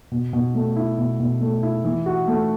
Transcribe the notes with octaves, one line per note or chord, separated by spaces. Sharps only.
B2
B2
A3
E4
B2
B2
A3
E4
E3
F#4
A3